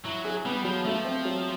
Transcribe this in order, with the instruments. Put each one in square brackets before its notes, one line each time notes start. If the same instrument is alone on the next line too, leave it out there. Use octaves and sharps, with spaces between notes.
[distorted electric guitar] F#3 [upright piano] E4
[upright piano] G#4
[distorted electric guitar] G3 [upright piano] B3
[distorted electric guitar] F3 [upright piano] F#3
[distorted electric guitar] F3 [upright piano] A3
[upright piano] C4
F#3